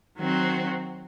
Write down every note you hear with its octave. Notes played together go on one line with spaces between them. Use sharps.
D#3 F#3 C4 F#4